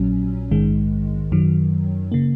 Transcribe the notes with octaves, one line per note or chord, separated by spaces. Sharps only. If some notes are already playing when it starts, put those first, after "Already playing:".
Already playing: A#1 A#2 F#3 C#4
A#1 G#2 D#3 G#3
F#2 D#3 F#3
C#3 A#3